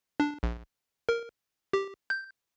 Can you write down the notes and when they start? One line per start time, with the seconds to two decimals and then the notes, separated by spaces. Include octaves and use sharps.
0.20 D4
0.43 A#1
1.09 A#4
1.73 G4
2.10 G6